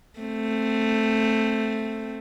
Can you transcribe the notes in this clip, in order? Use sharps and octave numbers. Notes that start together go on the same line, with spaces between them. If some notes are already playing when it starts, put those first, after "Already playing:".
A3 C4